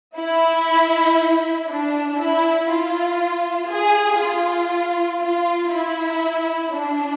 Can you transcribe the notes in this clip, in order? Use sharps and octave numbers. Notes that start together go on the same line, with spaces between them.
E4
D4
E4
F4
G#4
F4
F4
E4
D4